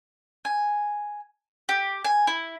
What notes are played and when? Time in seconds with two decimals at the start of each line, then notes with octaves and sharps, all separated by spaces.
0.45 G#5
1.69 G4
2.04 G#5
2.27 E4